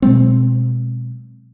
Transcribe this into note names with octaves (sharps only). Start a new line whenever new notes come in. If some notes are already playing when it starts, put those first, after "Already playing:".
B2 F#3 G#3 C4